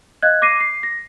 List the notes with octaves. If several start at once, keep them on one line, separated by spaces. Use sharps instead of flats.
D#5 F5 F#6 G#6
D6 A#6 C7 D#7
C7
A#6